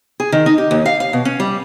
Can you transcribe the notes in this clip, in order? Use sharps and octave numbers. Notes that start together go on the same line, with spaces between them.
G#4
D#3
D#4
G4
D#2
F5
F5
B2
C#4
G3